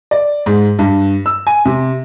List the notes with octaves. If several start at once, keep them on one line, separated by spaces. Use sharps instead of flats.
D5
G#2
G2
E6
G#5
C3